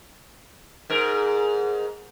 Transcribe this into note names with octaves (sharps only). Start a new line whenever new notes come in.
G#2 A#4